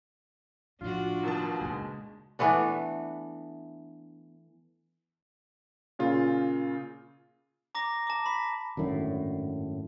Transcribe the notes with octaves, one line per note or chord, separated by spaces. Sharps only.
A2 F3 D4 F4 F#4
D#2 B2 A5
C#3 G#3 A#3
E3 A3 B3 D4
A#2 C#3 F4
A#5 D6 A#6
A5 D6
B5 D6 B6
G#1 F#2 A2 D3